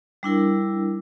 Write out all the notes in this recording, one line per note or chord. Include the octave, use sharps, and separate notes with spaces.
G3 D4 E4 A#4